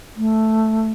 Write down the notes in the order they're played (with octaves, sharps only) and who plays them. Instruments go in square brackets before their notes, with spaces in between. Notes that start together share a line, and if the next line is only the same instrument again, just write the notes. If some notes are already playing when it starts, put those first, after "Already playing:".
[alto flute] A3